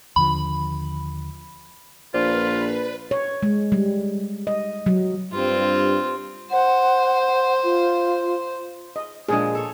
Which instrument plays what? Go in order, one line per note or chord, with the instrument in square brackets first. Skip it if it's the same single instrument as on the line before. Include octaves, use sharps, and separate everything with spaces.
[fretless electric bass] D#2 D3 F3 [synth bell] B5
[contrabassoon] A#1 [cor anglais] F4 [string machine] B4 [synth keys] C5 D5
[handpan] C#5
G#3
G3
D#5
F#3
[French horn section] G2 [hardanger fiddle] C4 F4
[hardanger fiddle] C5 [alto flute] F#5
[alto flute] F4
[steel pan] D#5
[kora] A#2 F3 G#3 [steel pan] D4 G#4
[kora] A4 C#5